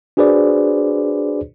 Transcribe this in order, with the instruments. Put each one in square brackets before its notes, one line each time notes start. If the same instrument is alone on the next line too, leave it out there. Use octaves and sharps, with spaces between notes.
[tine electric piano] D4 F#4 G#4 B4 C5 D5